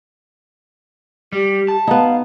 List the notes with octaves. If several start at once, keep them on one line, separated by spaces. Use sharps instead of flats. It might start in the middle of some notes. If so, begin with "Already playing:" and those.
G3 G4
A5
B3 D#4 F5